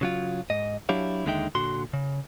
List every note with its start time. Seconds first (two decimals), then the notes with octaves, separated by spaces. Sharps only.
0.01 C#3 F#3 F4
0.50 G#2 D#5
0.89 F#3 D4 E4 G4 C#5 F5
1.26 D#2 D3 G#3 D#4 E5 G5
1.55 A#2 D3 F#4 C6
1.93 C#3